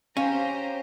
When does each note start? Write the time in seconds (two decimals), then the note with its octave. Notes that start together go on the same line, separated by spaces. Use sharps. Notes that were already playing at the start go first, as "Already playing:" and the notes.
0.17 C#4 G4 C5 F5 A#5